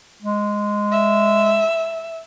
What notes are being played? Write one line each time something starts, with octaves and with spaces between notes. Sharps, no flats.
G#3
E5